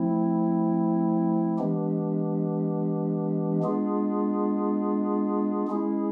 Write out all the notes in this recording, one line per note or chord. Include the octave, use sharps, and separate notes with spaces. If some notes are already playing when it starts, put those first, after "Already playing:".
Already playing: F3 A3 C4 E4
E3 G#3 B3 D4 G4
G#3 B3 D4 F4 G#4
G#3 C#4 E4 G#4